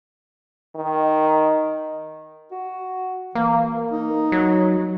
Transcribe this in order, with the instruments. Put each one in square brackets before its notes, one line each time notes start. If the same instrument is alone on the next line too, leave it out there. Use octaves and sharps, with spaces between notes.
[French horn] D#3
[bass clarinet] F#4
[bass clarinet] E3 [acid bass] A#3
[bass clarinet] D#4
[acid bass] F#3